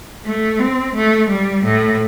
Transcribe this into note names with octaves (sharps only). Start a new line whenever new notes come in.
A3
C4
A3
G3
A2